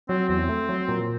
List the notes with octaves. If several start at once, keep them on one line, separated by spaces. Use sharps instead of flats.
F#3 C4
E2 C4
A3
F#3
A#2